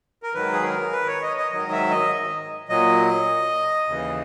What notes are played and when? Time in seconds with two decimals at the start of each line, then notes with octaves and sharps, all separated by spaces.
0.23 A#4
0.34 G#2 D#3 F#3 B4
0.53 G#4
0.63 A#4
0.92 B4
1.07 C#5
1.22 D#5
1.37 D#5
1.51 G#2 D#3 F#3 D#5
1.71 E5
1.91 D#5
2.69 A#2 F#3 D#5
3.87 D#2 C#3 E3